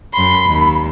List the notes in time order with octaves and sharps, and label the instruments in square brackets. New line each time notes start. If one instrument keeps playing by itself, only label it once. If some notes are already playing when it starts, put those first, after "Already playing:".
[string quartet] F#2 C6 [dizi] B5
[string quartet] D#2